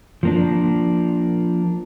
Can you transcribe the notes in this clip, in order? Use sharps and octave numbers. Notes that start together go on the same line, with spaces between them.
F3 A#3 D4